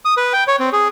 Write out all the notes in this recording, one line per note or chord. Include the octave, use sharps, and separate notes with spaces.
D#6
B4
G5
C#5
C4
G#4